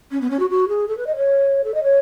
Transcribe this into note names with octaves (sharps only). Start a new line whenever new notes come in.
C#4
B3
C#4
F#4
F#4
G#4
A4
B4
D#5
C#5
A4
D#5
C#5